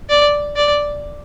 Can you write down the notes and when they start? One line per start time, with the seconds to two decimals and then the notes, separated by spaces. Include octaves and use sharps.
0.09 D5
0.56 D5